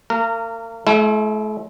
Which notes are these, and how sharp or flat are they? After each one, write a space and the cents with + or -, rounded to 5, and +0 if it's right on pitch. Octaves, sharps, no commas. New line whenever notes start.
A#3 -40 A#4 -20
A3 -45 E4 +15